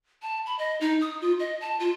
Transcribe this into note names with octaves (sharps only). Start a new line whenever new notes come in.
A5
B5
D#5
D#4
D#6
F4
D#5
A5
F4